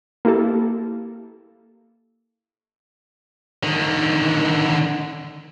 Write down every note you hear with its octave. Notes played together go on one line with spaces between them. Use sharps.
A#3 E4 G4 A4
D3 D#3